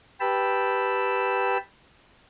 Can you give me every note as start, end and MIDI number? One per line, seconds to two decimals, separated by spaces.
0.20 1.57 67
0.20 1.57 71
0.20 1.57 79
0.20 1.57 81
0.20 1.57 83
0.20 1.57 88